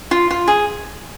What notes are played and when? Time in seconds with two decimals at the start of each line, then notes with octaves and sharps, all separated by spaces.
0.11 F4
0.31 F4
0.48 G#4